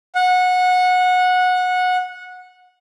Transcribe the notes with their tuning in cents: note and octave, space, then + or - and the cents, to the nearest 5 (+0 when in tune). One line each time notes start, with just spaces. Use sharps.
F#5 -20